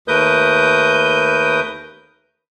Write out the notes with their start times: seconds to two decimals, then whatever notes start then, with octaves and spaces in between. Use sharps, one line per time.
0.08 D#2 A3 A#4 B4 D#6 G6